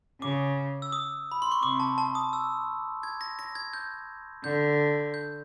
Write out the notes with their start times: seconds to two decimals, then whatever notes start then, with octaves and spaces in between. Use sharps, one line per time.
0.21 C#3 D6
0.82 E6
0.92 D#6
1.32 B5
1.42 C6
1.52 C#6
1.62 C3 D6
1.80 A5
1.98 A5
2.15 D#6
2.33 E6
3.03 G#6
3.21 A#6
3.39 A#6
3.55 G#6
3.73 G6
4.44 D3 G6
5.14 G6